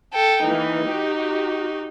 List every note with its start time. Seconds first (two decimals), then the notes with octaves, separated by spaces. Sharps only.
0.13 A4 G5
0.43 E3 A#3 D#4
0.84 F#4 G4